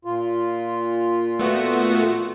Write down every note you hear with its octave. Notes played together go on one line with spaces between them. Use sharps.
A#2 F4
A3 B3 F#4